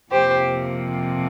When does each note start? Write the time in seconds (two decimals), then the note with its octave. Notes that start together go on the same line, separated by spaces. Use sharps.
0.11 F2 C3 F3 A#3 G4 C5